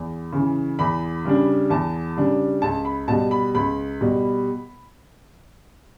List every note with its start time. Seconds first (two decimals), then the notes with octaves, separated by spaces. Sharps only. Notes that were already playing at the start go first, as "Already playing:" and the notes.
Already playing: E2
0.32 C#3 E3
0.79 E2 B5
1.25 C#3 G3 D4
1.70 E2 A5
2.17 C#3 G3 D4
2.62 C#2 A5
2.85 B5
3.08 B2 G3 A5
3.31 B5
3.55 C#2 B5
4.01 B2 G3